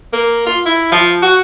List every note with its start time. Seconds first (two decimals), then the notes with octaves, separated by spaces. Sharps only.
0.13 A#3
0.46 F4
0.66 E4
0.92 F3
1.23 F#4